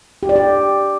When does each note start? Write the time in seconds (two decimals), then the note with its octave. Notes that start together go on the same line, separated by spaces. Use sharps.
0.23 G4
0.29 D5
0.36 G4